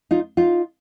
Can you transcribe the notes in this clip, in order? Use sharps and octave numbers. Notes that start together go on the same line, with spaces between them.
D#4 F4
D#4 F4